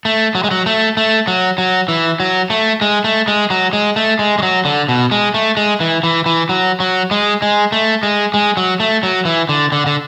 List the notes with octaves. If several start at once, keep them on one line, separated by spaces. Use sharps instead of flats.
A3
F#3
G#3
F#3
A3
A3
F#3
F#3
E3
F#3
A3
G#3
A3
G#3
F#3
G#3
A3
G#3
G#3
F#3
D3
B2
G#3
A3
G#3
E3
E3
E3
F#3
F#3
G#3
G#3
A3
G#3
G#3
F#3
A3
F#3
E3
D3
D3
D3